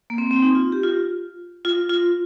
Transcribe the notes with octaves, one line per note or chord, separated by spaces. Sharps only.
A#3
C4
C4
D#4
F4
G4
F4
F4
F4